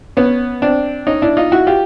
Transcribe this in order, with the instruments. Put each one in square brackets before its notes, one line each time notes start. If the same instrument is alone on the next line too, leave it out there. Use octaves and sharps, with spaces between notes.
[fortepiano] B3 C#4
C4 D4
C#4 D#4
D4 E4
D#4 F4
E4 F#4
F4 G4